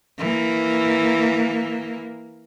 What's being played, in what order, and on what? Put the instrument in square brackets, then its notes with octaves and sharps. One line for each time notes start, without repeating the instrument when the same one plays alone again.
[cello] E3 A#3